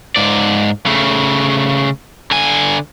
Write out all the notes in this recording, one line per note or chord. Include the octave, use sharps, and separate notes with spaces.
G#2 D5
C#3 A3
D3 G#5